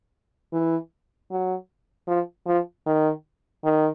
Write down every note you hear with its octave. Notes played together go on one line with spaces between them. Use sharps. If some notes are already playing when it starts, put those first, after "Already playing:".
E3
F#3
F3
F3
D#3
D#3